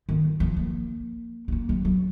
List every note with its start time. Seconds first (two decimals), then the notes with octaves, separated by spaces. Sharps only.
0.09 D#3
0.40 F3
0.57 A#3
1.48 B3
1.52 A#3
1.69 F#3
1.85 F#3